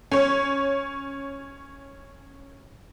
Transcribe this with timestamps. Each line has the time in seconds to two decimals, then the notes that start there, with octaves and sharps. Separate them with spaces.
0.11 C#4 C#5